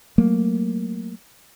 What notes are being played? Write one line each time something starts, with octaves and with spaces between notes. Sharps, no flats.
F#3 A3 A#3